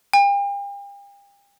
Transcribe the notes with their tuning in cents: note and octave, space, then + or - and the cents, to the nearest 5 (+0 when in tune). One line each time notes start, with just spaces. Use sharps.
G5 +40